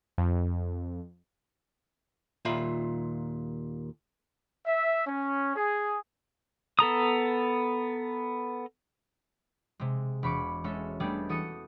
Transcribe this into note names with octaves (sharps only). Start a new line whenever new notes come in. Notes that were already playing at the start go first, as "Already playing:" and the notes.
F2
D#2 A#2 F4 E5 B5
E5
C#4
G#4
B3 A4 A#5 D#6
C3 G#3
E1 B5 C#6 D6
G#3 C#4 F#4 A4 E5
G3 A3 B3 D4 G4 G#4
E3 F#4 A4 D#6 C#7